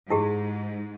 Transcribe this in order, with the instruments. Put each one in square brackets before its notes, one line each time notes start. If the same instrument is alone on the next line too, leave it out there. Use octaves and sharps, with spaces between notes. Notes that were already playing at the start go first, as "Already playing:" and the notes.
[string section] G#2 [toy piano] E4 G4 G#4